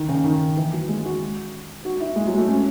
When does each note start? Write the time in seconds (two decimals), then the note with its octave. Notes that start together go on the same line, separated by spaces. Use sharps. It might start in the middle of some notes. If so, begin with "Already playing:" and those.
Already playing: D#3
0.08 C#3
0.24 D#3
0.57 E3
0.73 F#3
0.89 G#3
1.05 F#4
1.85 F#4
2.00 E4
2.16 G#3
2.27 F#3
2.34 G#3
2.38 A3
2.48 C#4